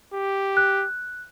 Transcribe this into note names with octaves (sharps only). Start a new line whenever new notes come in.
G4
F#6